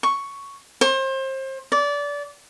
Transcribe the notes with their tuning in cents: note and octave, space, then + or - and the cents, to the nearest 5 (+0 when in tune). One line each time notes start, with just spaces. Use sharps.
C#6 +5
C5 +30
D5 -25